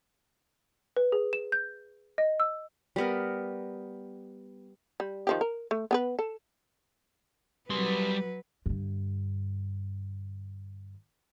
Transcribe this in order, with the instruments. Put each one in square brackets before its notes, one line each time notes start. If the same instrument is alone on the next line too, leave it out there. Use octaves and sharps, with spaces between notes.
[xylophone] B4
G#4
E7
G6
D#5
E6
[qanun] G3 B3 A#4
[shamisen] G3
D#3 F3 G4
A#4
A3
B3 G#4 B4
A4
[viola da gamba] F#3 B4 [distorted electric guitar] G3 C6
[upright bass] G2 D3